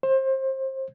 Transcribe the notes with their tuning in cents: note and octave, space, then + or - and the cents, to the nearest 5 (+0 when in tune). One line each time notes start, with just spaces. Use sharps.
C5 +25